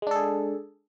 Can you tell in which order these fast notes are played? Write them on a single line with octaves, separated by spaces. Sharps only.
G#3 D4 A4 G#4